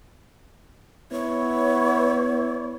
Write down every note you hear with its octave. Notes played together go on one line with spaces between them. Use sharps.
B3 E4 C#5